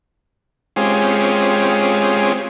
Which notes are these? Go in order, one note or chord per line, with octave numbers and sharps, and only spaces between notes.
G#3 C4 C#4 F4 G4 G#4